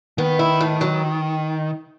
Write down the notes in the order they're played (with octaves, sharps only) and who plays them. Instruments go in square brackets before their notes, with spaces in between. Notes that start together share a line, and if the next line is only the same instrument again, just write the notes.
[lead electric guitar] D#3 [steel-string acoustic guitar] B3
[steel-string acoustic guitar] E4
A2
F#3